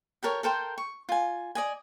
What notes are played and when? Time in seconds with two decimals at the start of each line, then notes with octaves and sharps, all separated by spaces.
0.23 G4 A4 A#4 C#5
0.43 A4 A#4 C5 G5
0.78 C#6
1.09 F4 G#5
1.55 D5 D#5 G#5